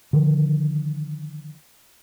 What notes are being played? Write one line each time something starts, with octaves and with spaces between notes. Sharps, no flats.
D3 D#3 F3